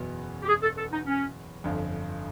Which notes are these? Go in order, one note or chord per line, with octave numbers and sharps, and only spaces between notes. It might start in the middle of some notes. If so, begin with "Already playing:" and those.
Already playing: F#1 E2 B2 F#3 B3
G4
G#4
A4
A4
D#4
C#4
G1 F2 D3